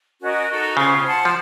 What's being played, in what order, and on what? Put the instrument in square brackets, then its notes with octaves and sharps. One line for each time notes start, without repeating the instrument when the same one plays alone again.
[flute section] C#4 F#4 A#4 D#5
D#4 F#4 A4
[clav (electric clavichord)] C#3 [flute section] C#4 F4 C5
[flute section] C5 F#5 A5
[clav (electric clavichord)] F3